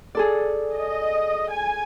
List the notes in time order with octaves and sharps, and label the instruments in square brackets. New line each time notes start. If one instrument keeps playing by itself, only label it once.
[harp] G#4 A4 D5
[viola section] D#5
G#5